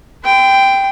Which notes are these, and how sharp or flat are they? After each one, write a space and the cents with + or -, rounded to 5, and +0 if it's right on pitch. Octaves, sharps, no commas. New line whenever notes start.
G5 +0 C6 -40